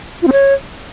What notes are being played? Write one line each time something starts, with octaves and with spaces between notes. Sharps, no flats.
F4
C4
C#5